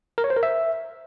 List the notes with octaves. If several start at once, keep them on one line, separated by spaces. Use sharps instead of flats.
A#4
C#5
C5
A#4
E5